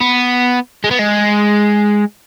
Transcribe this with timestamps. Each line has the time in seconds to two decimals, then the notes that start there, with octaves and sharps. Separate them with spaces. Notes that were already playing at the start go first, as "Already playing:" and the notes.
0.01 B3
0.84 G#3
0.91 B3
0.99 G#3